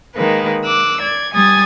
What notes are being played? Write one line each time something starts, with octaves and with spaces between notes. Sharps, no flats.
D#3 G#3 A#3 B4
D6 E6 F#6
D5 G#6
G3 G#5 D#6 G#6 A6